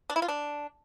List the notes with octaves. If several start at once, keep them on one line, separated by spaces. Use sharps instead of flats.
D4
E4
F4
D4